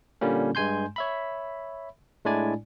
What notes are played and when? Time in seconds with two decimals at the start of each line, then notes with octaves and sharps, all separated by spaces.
0.21 A#2 D3 G3 A#3 C#4
0.55 G2 G#3 G#5 C6 G6
0.96 C#5 E5 B5
2.25 A2 G#3 D4 E4 D5 G#5